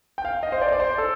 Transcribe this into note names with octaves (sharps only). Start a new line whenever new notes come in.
G5
F5
D#5
C5
D5
D5
C5
A4